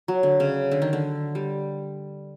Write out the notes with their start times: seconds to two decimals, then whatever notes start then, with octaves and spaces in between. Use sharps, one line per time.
0.08 F#3
0.23 D3
0.40 C#3
0.71 D3
0.82 D#3
0.93 D3
1.35 G3